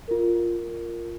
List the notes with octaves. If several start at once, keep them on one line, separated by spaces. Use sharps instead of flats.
F4 A#4